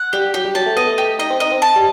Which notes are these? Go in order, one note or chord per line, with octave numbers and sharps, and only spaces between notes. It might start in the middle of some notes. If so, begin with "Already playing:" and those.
Already playing: F#5
G3 G4
F#3 G4
G3
F#3 A5
A3
B3 D#5
A3
G4
D#4 D#5
C4
D#4 D#5
C4
A5
G3